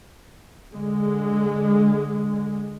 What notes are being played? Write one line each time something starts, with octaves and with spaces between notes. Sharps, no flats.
D3 G#3